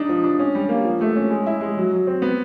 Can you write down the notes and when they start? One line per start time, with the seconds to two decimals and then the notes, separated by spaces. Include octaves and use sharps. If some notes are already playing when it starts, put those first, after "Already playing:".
Already playing: D4 D#4
0.09 F3
0.24 D4
0.39 C#4
0.55 G3
0.69 A#3
0.85 F3
1.01 A3
1.15 C#4
1.30 G#3
1.46 E4
1.61 G#3
1.77 F#3
1.92 F#3
2.07 C4
2.22 B3